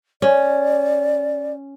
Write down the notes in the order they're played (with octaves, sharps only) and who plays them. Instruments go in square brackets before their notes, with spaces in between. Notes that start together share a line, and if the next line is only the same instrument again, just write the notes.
[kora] C#4 [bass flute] D5